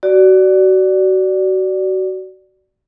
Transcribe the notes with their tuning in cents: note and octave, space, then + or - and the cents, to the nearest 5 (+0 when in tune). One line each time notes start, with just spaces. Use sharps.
F#4 +25 D5 +0